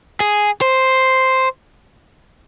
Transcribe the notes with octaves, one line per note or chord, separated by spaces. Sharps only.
G#4
C5